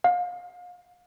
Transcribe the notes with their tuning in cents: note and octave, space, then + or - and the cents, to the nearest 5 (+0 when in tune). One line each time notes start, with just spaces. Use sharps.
F5 +35